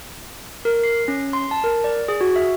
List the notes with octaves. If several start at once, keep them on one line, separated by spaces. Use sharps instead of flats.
A#4
C7
C#4
C6
A5
A#4
D5
G#4
F#4
E5